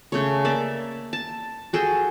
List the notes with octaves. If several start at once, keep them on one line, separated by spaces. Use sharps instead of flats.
C#3 A3 C#5
A#3 D5 E5 D6
A5
F#4 G#4 A4 G5